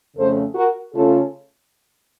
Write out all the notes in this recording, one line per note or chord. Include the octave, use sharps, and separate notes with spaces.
F2 C#3 A3 C#4 A4 C5
F#4 A#4
C#3 A3 C#4 F4 A4